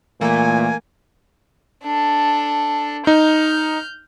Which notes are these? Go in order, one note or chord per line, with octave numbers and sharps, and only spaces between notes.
A#2 E3 A3 A#3 G#5
D4 A4
D#4 F6 G6